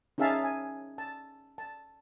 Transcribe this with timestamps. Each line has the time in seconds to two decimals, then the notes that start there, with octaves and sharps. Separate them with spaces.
0.18 C#4 D#4 G#4 E5 F5 A5
0.44 G#5
0.98 A5
1.58 A5